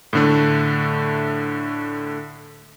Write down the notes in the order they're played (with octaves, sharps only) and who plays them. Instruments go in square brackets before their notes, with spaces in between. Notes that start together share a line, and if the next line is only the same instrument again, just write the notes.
[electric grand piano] A2 D3 A3